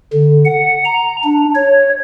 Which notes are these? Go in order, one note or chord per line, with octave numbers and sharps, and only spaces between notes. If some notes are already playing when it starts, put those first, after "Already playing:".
D3
F#5
A#5
D4
C#5